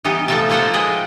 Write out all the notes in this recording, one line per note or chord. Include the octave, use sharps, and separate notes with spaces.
E3 G3 B3 D#4 G4
F3 A3 D#4 F4 E5 A5
F3 A#3 F4 A4 C5 F#5
G#3 G#4 B4 D#5 G5